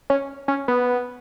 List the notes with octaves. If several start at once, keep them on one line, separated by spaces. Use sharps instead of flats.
C#4
C#4
B3